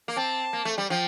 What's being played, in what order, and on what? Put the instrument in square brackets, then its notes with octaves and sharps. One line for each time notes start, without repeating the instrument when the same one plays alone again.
[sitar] A#3
[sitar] C4 [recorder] A5
[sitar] A#3
A3
G3
[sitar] F3 [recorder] G5